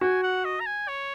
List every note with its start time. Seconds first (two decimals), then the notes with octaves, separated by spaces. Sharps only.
0.01 F#4 G#5
0.23 F#5
0.45 D#5
0.60 A#5
0.66 G#5
0.88 C#5